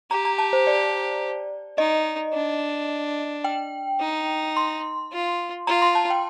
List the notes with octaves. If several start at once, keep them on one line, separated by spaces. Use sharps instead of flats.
G4 A#5
A#5
A5
C5
D5
D#4 D#5
D4
G5
D#4
C6
F4
F4 A#5
C6
A5
G5